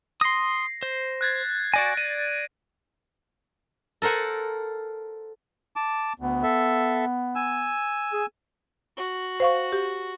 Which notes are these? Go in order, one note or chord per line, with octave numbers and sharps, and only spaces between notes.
C6 D#6 A#6 C7
C5
F#6 G#6 A6
F#4 D5 G#5 A#6 D7
D5 D#7
A4 A#4 C5 F#5 G#5
A5 D6
D2 B3
A4 E5
G#5 E6
G#4
F#4
C5 F5 C#6
G4